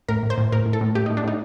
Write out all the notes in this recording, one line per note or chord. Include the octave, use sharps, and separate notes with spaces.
A2 A#4
A2
C5
A2
A2 A#4
A2
A4
A2
A2 G4
D#4
A2
D4
A2 D#4